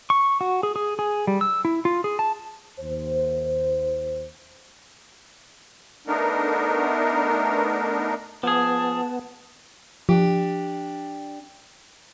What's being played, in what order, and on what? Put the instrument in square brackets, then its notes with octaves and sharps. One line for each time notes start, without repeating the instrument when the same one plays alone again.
[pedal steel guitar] C#6
F#4
G#4
G#4
G#4
G3
E6
E4
F4
G#4
A5
[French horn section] D#2 C5
[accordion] A3 B3 D4 D#4 A#4
[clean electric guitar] F3 G#4 [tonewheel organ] B3 [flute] A5
[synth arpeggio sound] F3 [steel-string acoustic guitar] D4 G4